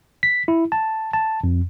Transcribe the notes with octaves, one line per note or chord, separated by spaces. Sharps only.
B6
E4
A5
A5
F2